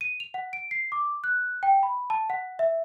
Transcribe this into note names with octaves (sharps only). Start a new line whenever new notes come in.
D#7
F7
F#5
D7
C7
D6
F#6
G5
B5
A5
F#5
E5